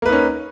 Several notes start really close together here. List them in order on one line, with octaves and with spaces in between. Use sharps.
A#3 B4 D#4 C#4